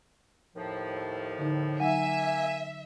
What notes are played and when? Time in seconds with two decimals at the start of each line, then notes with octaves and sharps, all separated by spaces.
0.56 D#2 A2 F3
1.39 D3 D#4
1.80 F#3 A#3 D#4 E5 F#5 G#5